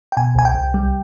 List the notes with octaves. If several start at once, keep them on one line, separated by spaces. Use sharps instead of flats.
G5
B2 G#5
C2 G#5
G5
C2
G3